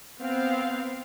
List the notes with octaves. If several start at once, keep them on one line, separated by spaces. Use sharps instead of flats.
B3 C4 F5